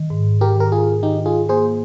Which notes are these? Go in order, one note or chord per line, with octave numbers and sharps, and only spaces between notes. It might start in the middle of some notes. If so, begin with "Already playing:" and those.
Already playing: D#3
G#2
G4 A#4
D#3 A#4
F4 G#4
D#3 D#4 G4
F4 G#4
A#3 G#4 C5